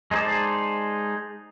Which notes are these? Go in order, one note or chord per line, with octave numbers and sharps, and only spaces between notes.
G#3 D#4 C5 D5 A5